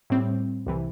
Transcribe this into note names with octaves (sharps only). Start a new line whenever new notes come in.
A2 G3 C4
C2 C3 E3